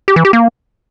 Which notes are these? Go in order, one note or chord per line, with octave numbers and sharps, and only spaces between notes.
G4
E3
G4
A#3